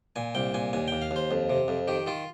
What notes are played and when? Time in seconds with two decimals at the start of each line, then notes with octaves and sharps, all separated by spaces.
0.16 A#2 G#5
0.35 C2 G5
0.54 A#2 G#5
0.73 D#2 G#5
0.88 D#2 G5
1.02 F5
1.11 D#2
1.16 C5
1.31 F2
1.50 C3
1.68 F2
1.88 D#3 G4
2.06 D#3 F4